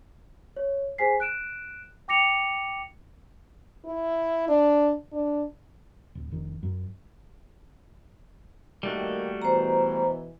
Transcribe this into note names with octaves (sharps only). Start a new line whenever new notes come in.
C#5
G#4 C5 G#5 B6 C7
F#6 D7 E7
G5 D6 A#6 C#7 F7
E4
D4
D4
D1
F1 D#3
F#2
D#3 G3 A3 A#3 F#4
B2 E3 C5 A#5